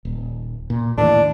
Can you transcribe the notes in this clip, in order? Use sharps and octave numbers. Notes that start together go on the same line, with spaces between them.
D#1
A#2
D#2 A2 E3 D4